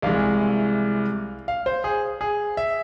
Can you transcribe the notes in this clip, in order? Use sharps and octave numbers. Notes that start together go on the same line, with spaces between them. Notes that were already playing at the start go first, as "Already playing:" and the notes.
C2 C3 E3 G#3 F5
F5
C5
G#4
G#4
E5